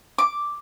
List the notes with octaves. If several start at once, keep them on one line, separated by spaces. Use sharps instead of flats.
D6